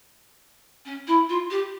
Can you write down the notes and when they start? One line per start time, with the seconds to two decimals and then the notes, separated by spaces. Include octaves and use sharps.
0.85 C#4
1.07 E4
1.29 F4
1.50 G4